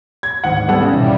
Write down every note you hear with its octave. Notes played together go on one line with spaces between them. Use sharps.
G#6
G#1 D2 G#2 F#5
G3 B3 A4 F#5 D#6 G#6 A6
C#3
E2 G#2 B2